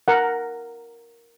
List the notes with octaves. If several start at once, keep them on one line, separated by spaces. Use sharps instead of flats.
A#4 F#5